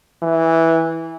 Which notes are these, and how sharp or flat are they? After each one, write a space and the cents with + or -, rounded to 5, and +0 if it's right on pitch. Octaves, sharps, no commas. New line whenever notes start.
E3 -10